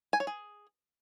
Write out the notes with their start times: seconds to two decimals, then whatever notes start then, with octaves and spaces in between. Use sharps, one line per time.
0.13 G#5
0.20 C#5
0.27 G#4